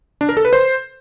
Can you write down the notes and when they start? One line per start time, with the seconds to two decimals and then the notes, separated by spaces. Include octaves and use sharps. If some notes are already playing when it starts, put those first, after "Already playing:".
0.21 D4
0.29 A#4
0.37 A4
0.45 B4
0.53 C5